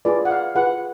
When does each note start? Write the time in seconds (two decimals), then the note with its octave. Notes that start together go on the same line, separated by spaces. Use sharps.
0.05 F4 G#4 B4 D5
0.25 F#5
0.30 F5
0.55 F4 G#4 B4 F#5